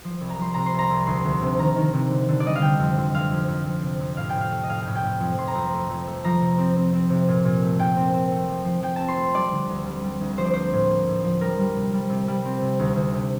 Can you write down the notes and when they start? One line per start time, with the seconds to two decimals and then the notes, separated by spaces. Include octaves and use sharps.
0.05 F3
0.21 C2
0.30 A#5
0.38 F3 C6
0.54 C3 A#5
0.66 C6
0.73 C2
0.79 A#5
0.90 C2
1.07 D2 C6
1.25 D2
1.41 C3
1.59 D#3 A#5
1.76 D#3
1.93 C3
2.10 D3
2.29 D3
2.40 D5
2.45 G3 D#5
2.55 F5
2.62 D3 G5
2.79 F2
2.98 F2
3.14 F2 F5
3.31 F2
3.48 F2
3.66 F2
3.83 C3
4.00 F2
4.17 A2 F5
4.30 G5
4.35 A2
4.41 F5
4.52 A3
4.63 D#5
4.69 A2 F5
4.83 A2 G5
4.95 G5
5.04 A2
5.20 F2
5.38 F2 C6
5.47 A#5
5.55 F2
5.73 A3
5.91 F2
6.07 A3
6.24 F3 A#5
6.41 C3
6.58 C4
6.76 C4
6.94 C4
7.10 C3
7.28 A#2
7.45 A#2
7.62 A3
7.79 A#2 G5
7.96 C4
8.14 C4
8.32 A3
8.49 F3
8.65 F3
8.83 F3 G5
8.96 C4 A5
9.08 C6
9.17 A3
9.35 G3 D5
9.52 D3
9.69 D2
9.86 G3
10.04 G3
10.21 D2
10.38 F3 C5
10.45 D5
10.53 A#3 C5
10.73 A2
10.90 A#3
11.07 A2
11.24 F3
11.41 G3 A#4
11.59 G3
11.76 C3
11.94 G3
12.10 C3
12.28 G3
12.45 C4
12.62 C3
12.79 D2
12.96 D2
13.14 C3